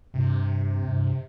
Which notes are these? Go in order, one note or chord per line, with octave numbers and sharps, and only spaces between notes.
G2 C3
G2